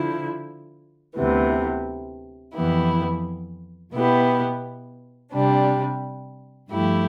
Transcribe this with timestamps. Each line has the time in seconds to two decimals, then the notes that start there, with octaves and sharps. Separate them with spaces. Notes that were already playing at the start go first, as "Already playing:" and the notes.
Already playing: D3 F3 E4
1.15 D2 C3 E3 B3
2.54 F2 E3 B3 E4 G4
3.92 B2 B3 E4 G4
5.31 C3 G3 D4
6.69 G2 F3 A3 E4 G4